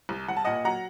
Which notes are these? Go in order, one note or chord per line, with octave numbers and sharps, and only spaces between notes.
C2
C2 F#5
A5
A#2 D#5 F#5
F#3 F#5 A#5